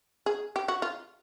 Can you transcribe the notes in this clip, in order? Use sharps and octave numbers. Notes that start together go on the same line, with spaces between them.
G#4
G4
F#4
F4